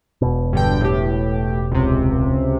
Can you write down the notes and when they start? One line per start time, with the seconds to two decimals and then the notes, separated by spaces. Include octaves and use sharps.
0.22 E1 B2
0.53 G2 D3 G5
0.81 A2 G4
1.71 C#2 C3